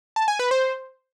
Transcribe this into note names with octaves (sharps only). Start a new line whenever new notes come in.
A5
G#5
B4
C5